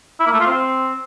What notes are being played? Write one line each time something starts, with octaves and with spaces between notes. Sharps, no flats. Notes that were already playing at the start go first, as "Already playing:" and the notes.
E4
A#3
A3
F4
C4